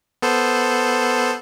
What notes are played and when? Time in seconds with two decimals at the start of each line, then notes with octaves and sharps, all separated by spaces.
0.22 B3 A4 C5